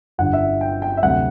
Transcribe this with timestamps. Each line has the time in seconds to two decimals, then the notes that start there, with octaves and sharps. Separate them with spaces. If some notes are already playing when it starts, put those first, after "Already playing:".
0.18 G1 G2 D3 F#5
0.33 E5
0.61 G5
0.82 G5
0.97 E5
1.02 D2 C3 F#3 F#5